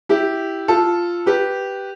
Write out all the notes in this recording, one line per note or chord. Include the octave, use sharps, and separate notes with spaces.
E4 G4
F4 A4
G4 B4